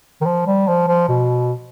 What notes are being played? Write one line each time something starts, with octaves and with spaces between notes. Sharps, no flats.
D#3
F3
G3
F3
F3
B2